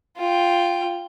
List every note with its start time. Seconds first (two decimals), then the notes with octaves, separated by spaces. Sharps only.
0.17 F4 G5